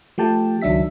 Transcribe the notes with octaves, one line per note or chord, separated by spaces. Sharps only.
F3 A3 G4 G5 A5
C#2 D#3 F#3 D4 E5 B6